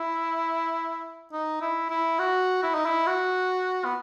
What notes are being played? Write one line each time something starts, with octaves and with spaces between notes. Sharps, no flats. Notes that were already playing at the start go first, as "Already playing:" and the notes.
Already playing: E4
D#4
E4
E4
F#4
E4
D#4
E4
F#4
B3